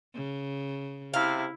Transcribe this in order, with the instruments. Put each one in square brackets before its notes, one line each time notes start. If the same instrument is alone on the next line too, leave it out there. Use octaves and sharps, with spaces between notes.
[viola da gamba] C#3
[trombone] C3 [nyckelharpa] E4 [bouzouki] F5